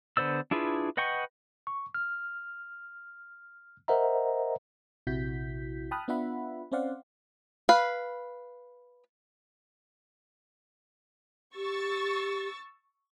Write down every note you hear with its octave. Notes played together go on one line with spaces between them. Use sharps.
D3 B3 C5 D5 E6
D4 E4 F4 G#4 B4
B4 D#5 F#5 G5 C#6
C#6
F6
A#4 C5 D#5 E5 F#5 A#5
A#1 C3 E4 F#4 G6 B6
G5 A5 B5 D#6 F6 F#6
B3 D4 F4 E5 F#5 B5
C4 C#4 C5 D5 F5 F#5
B4 F5
G4 C#6 E6 A6